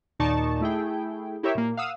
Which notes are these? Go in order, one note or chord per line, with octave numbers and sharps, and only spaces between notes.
D#2 A#2 D#4 D5 A5 C#6
A3 E4 G#4 G5
E4 G4 A#4 C#5 E5
A#2 A#3
F5 F#5 D#6 E6